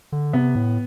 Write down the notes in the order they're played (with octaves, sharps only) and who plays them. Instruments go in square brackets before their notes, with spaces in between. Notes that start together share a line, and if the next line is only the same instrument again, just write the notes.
[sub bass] D3
[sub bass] C3 [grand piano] B3
[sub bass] A2